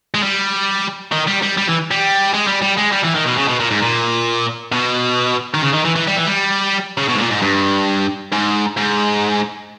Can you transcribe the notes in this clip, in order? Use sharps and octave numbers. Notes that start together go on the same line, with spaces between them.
G#3
G3
D#3
G3
G3
G3
E3
G3
G#3
G3
G3
G#3
G3
E3
D#3
B2
C#3
B2
A#2
G#2
A#2
B2
D#3
C#3
D#3
E3
E3
G3
E3
G3
C#3
B2
G#2
A#2
G#2
G2
G#2
G#2